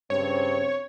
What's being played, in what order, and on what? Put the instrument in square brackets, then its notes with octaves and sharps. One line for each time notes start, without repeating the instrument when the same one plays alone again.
[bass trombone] G2 [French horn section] C#3 C4 [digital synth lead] C#5